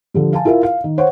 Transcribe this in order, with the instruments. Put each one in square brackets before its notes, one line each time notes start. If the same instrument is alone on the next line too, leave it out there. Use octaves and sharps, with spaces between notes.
[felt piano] D3 F3 G3
F5 G#5 A5
E4 F4 A#4 E5 F5
F5
D#3
C5 C#5 F#5